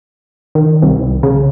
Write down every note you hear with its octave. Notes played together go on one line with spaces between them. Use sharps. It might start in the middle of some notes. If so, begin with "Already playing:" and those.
D#3
C2
C#3